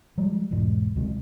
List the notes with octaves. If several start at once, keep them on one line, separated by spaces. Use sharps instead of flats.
F3 G3 G#3
E1 E2 G#2
D2 C3 G#3